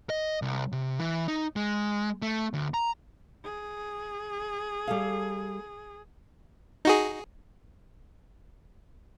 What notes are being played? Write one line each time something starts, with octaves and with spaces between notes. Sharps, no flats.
D#5
C2
C3
E3
D#4
G#3
A3
D2
A#5
G#4
G3 A4 F5
D#4 F#4 G#4